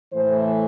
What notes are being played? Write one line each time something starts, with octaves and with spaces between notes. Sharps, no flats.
A2 E3 A3 C5